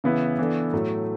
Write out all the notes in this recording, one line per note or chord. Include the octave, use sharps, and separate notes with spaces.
C#3 E3 B3 E4 B4
E3 B3 D4 A4
A2 F#3 A3